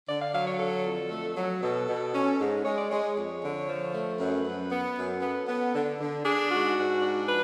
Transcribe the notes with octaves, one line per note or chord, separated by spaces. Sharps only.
D3 D5
F5
F#3 F5
C#5
D3 A4
F2
A3
F#3
B2 A4
B2
C#4
G#2
G#3 C#5
D5
G#3 C#5
F2
D3
F3
A3
F#2 B4
F#2
B3
F#2
B3 A4
B3
D3
D3
D4 G#4
G#2 F#4
G#2
D4
F3 B4